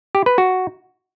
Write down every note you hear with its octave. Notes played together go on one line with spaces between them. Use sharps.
G4
B4
F#4